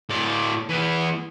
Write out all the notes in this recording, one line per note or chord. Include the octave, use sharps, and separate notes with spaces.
A2 D5
E3 B3